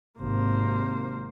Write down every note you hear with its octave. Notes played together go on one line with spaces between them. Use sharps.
G#1 C3 A#3 C5